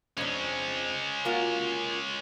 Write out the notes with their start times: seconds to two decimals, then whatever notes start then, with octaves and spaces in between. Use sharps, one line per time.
0.17 F2 G#3 C#4 D4
1.25 A#3 F4 F#4